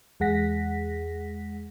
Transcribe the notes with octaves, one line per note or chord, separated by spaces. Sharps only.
E2 G#3 G#4 F#5 A#6 B6